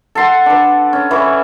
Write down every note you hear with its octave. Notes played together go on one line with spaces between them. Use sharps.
A4 F#5 C6
D4 B4
C#4
E3 E4 C#6